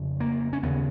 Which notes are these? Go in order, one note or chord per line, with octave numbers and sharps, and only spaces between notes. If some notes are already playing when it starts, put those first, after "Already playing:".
Already playing: F2 C#3
A#3
C#4
D#2 C#3 B3